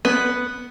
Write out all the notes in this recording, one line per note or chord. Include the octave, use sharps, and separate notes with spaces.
B3